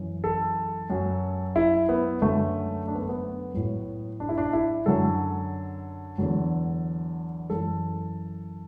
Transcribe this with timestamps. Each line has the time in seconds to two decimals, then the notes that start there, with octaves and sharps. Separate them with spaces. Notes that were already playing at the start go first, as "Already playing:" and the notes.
Already playing: F#2 E3
0.24 A4
0.90 F#2 F#3
1.56 E4
1.89 B3
2.22 F#2 D3 F#3 A3
2.88 D4
2.95 B3
3.02 A3
3.09 B3
3.54 A2 F#3
4.20 D4
4.29 E4
4.38 D4
4.53 E4
4.86 F#2 D3 F#3 A4
6.18 E2 D3 F#3
7.50 F#2 E3 A4